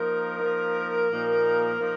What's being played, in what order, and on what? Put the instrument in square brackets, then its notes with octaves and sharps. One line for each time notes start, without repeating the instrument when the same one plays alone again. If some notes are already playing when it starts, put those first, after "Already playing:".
Already playing: [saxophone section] F3 A#3 D#4 A#4
F3 A#3 D#4
A#2 F3 A#3 D#4
A#2 F3 A#3 D#4